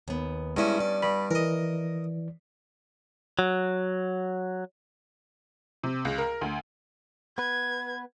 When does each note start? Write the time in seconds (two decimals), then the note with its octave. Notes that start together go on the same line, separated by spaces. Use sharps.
0.08 D#2 B3
0.57 G2 G#3 C#4 E4
0.80 D5
1.03 G2 B5
1.31 E3 A#4 D#5
3.39 F#3
5.83 C3
6.05 C#2
6.18 A#4
6.41 D2
7.38 B3 B4 G#6